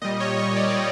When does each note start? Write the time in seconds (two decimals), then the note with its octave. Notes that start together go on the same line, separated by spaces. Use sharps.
0.02 A#2 G3 D#5
0.20 C#5
0.38 C#5
0.56 D5
0.74 G3